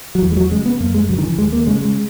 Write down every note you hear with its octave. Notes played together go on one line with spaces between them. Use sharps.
F#3
E2 E3
G#3
F#3
C#3 G#3
B3
F#2 A#3
G#3
C#3 F#3
D#3
E3
D#2 G#3
A#3
C#3 G#3
G#3